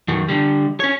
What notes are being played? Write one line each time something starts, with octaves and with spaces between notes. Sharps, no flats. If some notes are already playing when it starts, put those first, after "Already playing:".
F#2 D#3
D3 G3
C#4 C#5